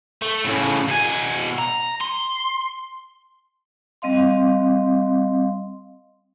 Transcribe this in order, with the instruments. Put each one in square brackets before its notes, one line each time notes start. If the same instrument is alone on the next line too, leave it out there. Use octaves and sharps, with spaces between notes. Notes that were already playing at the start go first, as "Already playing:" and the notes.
[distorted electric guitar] A3
A2 C#3
B2 G#5
A#5
C6
[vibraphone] G3 C4 D#5 F5 C6